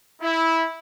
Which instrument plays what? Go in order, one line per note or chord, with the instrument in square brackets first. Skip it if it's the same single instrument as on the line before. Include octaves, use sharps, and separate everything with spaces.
[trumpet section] E4